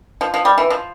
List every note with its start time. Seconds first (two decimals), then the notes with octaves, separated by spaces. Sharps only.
0.21 F3
0.34 F3
0.45 G3
0.58 E3
0.70 F3